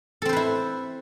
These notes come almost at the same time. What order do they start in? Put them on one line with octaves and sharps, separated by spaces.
A4 C4 C5 B4 E4